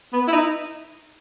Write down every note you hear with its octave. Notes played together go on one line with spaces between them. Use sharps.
B3
E4
D#4